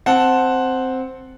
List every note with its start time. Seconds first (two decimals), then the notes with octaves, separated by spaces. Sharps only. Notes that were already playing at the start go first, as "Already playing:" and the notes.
0.06 C4 F#5 A5